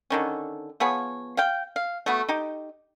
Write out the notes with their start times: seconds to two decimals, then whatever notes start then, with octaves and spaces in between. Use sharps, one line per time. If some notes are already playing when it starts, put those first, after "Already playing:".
0.10 D3 D#3 C#4
0.80 F3 B3 G#4 C#5
1.37 F5 G5
1.76 F5
2.06 A3 B3 F#4
2.29 D#4 G4